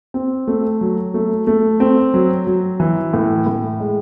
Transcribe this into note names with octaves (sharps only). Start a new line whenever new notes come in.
C4
A3
F#3
A3
A3
C4
F#3
F#3
E3
A2
A2
G#3